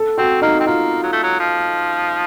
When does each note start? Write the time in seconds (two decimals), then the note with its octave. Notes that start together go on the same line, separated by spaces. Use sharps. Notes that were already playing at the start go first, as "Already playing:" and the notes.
Already playing: A4
0.18 C4 F#4
0.42 A#3 D#4
0.60 C4
0.67 A#3 F4
1.03 F#3
1.13 A3
1.23 F#3
1.40 F3